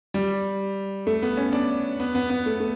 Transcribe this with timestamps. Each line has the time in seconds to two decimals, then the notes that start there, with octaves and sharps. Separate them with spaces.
0.14 G3
1.07 A3
1.22 B3
1.37 C#4
1.53 D4
2.00 B3
2.15 B3
2.30 B3
2.46 A3
2.60 A3